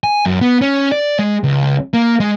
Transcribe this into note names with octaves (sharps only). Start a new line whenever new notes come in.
G#5
F#2
B3
C#4
D5
G#3
C#2
A#3
G#3